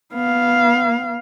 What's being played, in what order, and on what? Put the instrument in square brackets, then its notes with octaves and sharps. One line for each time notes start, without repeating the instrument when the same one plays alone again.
[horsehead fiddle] B3 F5